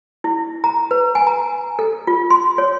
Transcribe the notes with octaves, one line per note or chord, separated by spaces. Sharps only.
E4
A#5
B4
G#5
A#5
A4
F4
C6
C#5